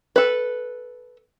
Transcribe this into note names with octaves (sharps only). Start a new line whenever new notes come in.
A4 B4